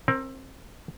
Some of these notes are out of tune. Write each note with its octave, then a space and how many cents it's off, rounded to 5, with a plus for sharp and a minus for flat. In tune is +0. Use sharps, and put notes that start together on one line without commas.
C4 +25 A#4 +0